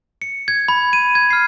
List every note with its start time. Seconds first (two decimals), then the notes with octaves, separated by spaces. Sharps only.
0.22 C#7
0.48 G#6
0.68 B5
0.93 D#7
1.15 G#6
1.30 F6 C7